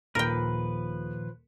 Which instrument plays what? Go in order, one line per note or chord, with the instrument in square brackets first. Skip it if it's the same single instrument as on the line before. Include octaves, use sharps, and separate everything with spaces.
[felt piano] D#1 [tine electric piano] A#2 D#3 [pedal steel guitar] F3 B4 [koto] A#4 G5